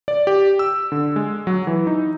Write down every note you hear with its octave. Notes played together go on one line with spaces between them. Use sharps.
D5
G4
E6
D3
G#3
F#3
E3
D#4